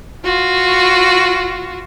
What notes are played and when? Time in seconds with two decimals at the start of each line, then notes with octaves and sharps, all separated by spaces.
0.24 F4 F#4